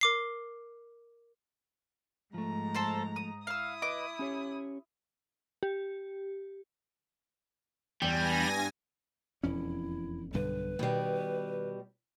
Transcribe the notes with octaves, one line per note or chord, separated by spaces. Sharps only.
A#4 D6 C7
G#2 F3 A3 A#5
A4 C5 A5
D#6
E4 F5 D#6 E6
B4 D#5 D6
C#4 G4 C#5
G4
E2 G2 G3 G#5 A#6
E1 F2 C#4 E4
B1 G2 D3 B4
B2 D#3 G3